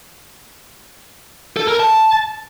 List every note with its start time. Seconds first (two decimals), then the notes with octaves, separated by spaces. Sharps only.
1.57 A4
1.68 A#4
1.80 A5